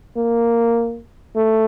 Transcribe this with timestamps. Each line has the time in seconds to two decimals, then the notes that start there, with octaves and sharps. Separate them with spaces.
0.17 A#3
1.36 A3